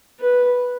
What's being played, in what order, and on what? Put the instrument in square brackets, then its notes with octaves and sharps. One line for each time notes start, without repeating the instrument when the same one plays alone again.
[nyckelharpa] B4